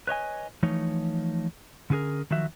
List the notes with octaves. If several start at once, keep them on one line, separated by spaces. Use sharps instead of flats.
B4 C#5 D#5 G#5
E3 F3 A3 D#4 C#5
D3 C#4 F4 G#4 A#4
D#3 F3 F#3 F#4 E5